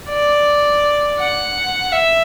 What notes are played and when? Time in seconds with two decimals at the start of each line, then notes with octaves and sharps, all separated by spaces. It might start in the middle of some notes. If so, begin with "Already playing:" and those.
0.09 D5
1.19 F#5
1.92 E5